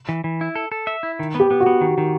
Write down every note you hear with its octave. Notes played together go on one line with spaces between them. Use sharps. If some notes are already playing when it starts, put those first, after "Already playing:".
E3
E3
E4
A4
A4
E5
E4
D#3
B3 G4
B3
F#4
B3
D#3
D#3